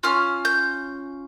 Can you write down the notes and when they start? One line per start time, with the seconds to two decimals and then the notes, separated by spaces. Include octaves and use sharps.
0.03 C#4 F4 F6
0.45 G6